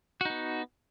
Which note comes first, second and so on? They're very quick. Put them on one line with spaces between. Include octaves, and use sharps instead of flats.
F#4 D#4 B3